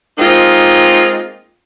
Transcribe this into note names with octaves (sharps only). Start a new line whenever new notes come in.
G#3 A#3 C4 D#4 F4